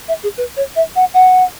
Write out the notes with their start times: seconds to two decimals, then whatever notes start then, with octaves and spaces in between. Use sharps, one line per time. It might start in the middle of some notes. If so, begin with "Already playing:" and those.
0.08 E5
0.23 G#4
0.37 B4
0.56 C#5
0.76 E5
0.96 F#5
1.14 F#5